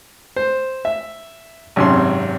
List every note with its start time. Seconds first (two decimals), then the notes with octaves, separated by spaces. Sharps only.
0.36 C5
0.85 E5
1.76 G#1 F#2 C3 C#4 C6